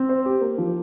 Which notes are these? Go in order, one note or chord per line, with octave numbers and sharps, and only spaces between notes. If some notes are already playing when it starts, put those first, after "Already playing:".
Already playing: C4
C5
G4
A#3
F3